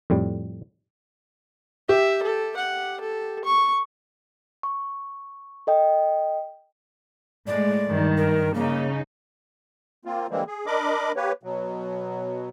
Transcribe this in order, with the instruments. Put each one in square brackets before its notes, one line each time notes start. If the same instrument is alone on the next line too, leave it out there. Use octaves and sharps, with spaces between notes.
[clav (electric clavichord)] F2 A2 G3
[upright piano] G4 [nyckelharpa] E5
[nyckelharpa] A4
F#5
A4
C#6
[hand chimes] C#6
A4 D#5 G5
[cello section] A2 G#3 [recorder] D5
[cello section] G2 D#3
[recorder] A#4
[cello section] C#3 D#4 [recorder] A#3
[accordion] A#3 C4 F4
D3 E3 G3 G#3 A#3 C4
G#4
D4 A#4 D#5 B5 D6
A#3 G4 B4 C#5
B2 F#3